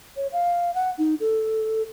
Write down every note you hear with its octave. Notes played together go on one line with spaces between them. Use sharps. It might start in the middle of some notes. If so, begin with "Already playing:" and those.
C#5
F5
F#5
D#4
A4